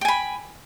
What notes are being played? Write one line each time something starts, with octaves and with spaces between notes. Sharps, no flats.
G5 G#5 B5